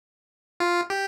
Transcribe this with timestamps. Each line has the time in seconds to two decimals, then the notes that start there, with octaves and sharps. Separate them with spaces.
0.60 F4
0.90 G4